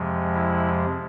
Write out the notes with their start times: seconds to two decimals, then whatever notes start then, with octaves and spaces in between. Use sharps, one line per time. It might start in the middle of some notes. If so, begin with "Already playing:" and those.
Already playing: F2 C3 F3 G#3
0.35 E4